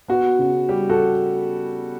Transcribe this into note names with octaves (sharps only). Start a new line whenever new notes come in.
B3 F#4
C#3
G3 G4
F#4 A4